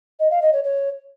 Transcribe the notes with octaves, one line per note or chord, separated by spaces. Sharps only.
D#5
F5
D#5
C#5
C#5